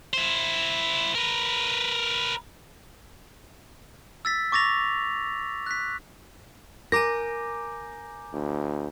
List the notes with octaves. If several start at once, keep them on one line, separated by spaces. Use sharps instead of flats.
E4 C5
A#4 B4
E6 A6 B6
C#6 D6 A6 A#6 F7
F#6 B6
A#4 G#5 A#5 D6 G6 A#6
D2